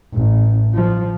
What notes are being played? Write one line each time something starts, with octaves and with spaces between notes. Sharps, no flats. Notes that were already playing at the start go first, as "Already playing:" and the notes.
A1
F3